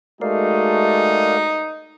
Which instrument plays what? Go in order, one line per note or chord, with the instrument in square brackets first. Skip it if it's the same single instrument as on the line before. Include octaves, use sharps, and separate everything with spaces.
[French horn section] G#3 A3 F#4 [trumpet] D#4 [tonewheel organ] A#4 D5 F5